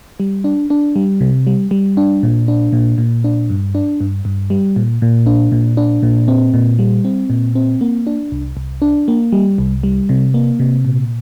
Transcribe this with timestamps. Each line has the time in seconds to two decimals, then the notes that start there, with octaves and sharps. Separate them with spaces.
0.20 G3
0.44 D4
0.70 D4
0.96 G3
1.21 C3
1.47 G3
1.71 G3
1.97 D4
2.23 A#2
2.48 D4
2.73 A#2
2.98 A#2
3.24 D4
3.50 G2
3.75 D4
4.00 G2
4.25 G2
4.50 G3
4.76 A#2
5.02 A#2
5.26 D4
5.52 A#2
5.77 D4
6.03 A#2
6.28 C4
6.54 A#2
6.79 G3
7.05 C4
7.30 A#2
7.55 C4
7.81 A#3
8.07 D4
8.32 C2
8.57 C2
8.82 D4
9.08 A#3
9.32 G3
9.58 C2
9.83 G3
10.09 C3
10.34 A#3
10.60 C3
10.85 A#2